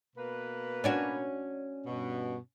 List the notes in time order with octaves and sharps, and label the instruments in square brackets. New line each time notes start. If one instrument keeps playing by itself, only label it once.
[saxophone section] B2 A#3 B4
[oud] C#4 D4 F#4
[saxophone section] G2 B2